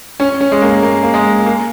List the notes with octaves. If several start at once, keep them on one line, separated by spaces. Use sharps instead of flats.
C#4
C#4
G#3
A#3
A#3
A#3
G#3
A#3